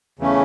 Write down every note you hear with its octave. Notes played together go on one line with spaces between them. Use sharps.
E2 C#3 E3 A3 C#4